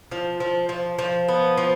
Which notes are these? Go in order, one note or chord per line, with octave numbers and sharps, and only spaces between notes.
F3
F3
F3
F3
B3
F3